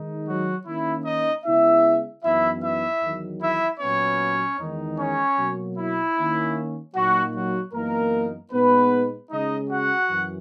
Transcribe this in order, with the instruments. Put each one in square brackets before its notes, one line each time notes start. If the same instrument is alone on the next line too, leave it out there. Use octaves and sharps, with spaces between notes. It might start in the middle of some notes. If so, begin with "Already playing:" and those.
Already playing: [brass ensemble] D#3 G#3 D#4
F#3 F#4
D#3 A#3 C#4 E4
D#4 D#5
C#3 G#3 B3 E4 E5
F#2 E3 B3 D#4 E4 E5
E4 E5
E2 D#3 F#3
E4 E5
A#2 F#3 B3 C#4 C#5
E2 D#3 G#3 D#4
C#4 C#5
B2 F#3 A#3
E4
D#3 A#3 C#4
A#2 F#3 A#3 D#4 F#4
F#3 F#4
F#2 E3 A#3 B3 D#4 A#4
A#2 G#3 B3 D#4 B4
C#3 G#3 C#4 D#4 D#5
F#4 F#5
F#2 E3